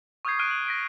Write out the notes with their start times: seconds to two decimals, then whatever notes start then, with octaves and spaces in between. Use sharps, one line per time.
0.25 C#6 D#6 F6 G6 G#6 C7
0.39 F6 F#6 D7 D#7
0.51 F#7
0.67 A#6 B6 D7